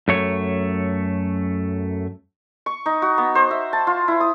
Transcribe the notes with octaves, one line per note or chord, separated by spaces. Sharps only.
F#2 A3 C#5
C#6
D#4
F#4
B3
C5
E5
A5
F4
E4
D#6